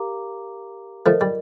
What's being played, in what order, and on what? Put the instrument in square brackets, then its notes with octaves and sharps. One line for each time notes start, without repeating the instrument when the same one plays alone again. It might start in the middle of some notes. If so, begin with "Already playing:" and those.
Already playing: [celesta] G4 A#4 F5 A#5 D6
[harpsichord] F3 A3 [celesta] F4 A#4 D#5
[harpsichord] G3